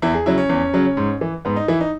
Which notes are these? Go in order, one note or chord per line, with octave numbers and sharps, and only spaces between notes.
E2 E4
G#4
C#3 F#3 E4
C#4
E2
C#3 F#3
G#2
E3
G#2 B3
D#4
E3 E4
D#4